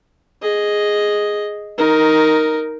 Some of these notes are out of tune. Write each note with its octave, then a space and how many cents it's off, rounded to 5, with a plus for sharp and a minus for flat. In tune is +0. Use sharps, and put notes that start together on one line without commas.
G#4 +0 D#5 +0
D#4 +10 A#4 +0